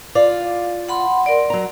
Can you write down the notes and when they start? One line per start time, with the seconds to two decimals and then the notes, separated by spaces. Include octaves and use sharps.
0.15 F4 D5 F5
0.89 F#5 B5 C6
1.26 A#4 D5
1.50 F#3 A#5